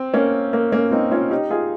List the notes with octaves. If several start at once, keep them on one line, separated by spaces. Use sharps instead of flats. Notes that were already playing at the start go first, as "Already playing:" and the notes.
Already playing: C4
A#3 C#4
A#3
A#3 C#4
C4 D#4
C#4 F4
D#4 G4
F4 G#4